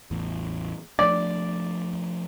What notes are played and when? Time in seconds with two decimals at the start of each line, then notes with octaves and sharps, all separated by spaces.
0.11 A1 E2
0.99 F3 A3 D4 D5